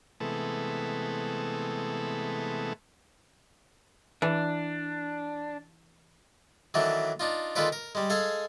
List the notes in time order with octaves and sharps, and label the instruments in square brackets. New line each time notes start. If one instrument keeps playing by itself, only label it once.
[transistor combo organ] C3 E3 G#3 A3 B3 A4
[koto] E3 [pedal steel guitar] D4
[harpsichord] D#3 E3 F#3 A3 D4
D4 D#4 F4
D#3 G#3 F4 A4 B4 D5
A#4
G3 G#3
G#3 G#4 A4 F5 G#5